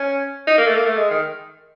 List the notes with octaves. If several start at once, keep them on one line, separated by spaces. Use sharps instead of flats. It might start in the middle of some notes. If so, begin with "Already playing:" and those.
Already playing: C#4
D#4
A#3
A3
A#3
A3
G#3
D#3